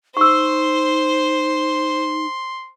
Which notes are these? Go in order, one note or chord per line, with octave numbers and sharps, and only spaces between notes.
D#4 C5 C6 C#6 E6